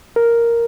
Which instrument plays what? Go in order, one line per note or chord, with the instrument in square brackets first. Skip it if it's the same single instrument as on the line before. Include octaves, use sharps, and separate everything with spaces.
[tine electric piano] A#4